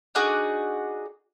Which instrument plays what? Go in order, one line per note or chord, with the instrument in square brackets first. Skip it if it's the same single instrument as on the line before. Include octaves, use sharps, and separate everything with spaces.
[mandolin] D4 D#4 F#4 G#4